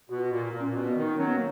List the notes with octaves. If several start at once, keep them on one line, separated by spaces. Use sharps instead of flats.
B2 F#4
F4
F#4
A#2 F4
A#2
C#4
A#2
B2
C#4
B3
D#3
F#3 C#4
B3
A#3